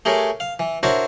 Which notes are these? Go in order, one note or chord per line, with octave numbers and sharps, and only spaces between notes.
A3 G4 G#4 A#4 C#5
F5
E3
D4 E4 F#4 A#4 C5 C#5